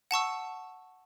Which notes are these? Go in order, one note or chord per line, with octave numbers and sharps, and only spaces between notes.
F#5 A5 C#6 E6